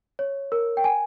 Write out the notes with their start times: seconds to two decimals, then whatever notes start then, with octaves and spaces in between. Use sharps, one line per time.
0.19 C#5
0.52 A#4
0.77 G5
0.84 G#5